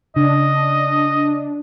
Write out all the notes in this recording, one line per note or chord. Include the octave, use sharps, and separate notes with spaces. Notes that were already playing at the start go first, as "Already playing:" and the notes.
C#3 D4 D#5